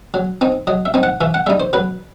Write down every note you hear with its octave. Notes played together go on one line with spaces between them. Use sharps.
F#3
C4 D#4
F#3 D#5
E5
C4 D#4
F#5
E3 E5
F#5
G3 D#4 E5
C5
F#3 B4